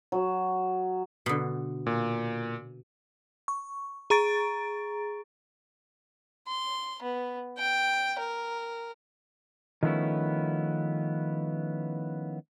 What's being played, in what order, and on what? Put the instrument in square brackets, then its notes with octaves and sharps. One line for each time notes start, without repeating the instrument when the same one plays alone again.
[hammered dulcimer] F#3
[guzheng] B2 D3
[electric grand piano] A#2
[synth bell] C#6
G#4 A#5 C#6 A6 D7
[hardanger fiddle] C6
B3
G5
A#4
[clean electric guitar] D#3 F3 A3 B3 C#4 E4